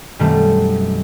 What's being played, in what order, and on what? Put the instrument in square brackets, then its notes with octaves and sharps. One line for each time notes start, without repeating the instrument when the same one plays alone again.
[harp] F#2 B2 D#3 G3 A3 C4